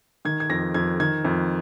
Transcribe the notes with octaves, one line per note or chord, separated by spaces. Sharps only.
D#3 G#6
G#6
F2 A#6
F2 G#6
D#3 G#6
F2